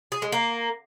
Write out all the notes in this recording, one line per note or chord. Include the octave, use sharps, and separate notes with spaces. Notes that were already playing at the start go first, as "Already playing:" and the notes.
G#4
G#3
A#3